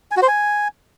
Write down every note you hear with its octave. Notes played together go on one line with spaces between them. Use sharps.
G#5
F#4
C5
G#5